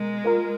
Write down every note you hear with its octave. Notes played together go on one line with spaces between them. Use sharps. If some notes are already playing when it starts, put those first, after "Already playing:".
Already playing: B2 G#3 A#4
A#3 F4 A#4